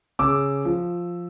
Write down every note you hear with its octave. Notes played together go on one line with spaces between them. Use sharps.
C#3 D6 E6
F3